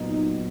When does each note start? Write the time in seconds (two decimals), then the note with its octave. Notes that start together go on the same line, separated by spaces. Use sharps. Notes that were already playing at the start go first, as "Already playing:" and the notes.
Already playing: A#2 F#3 B3 D#4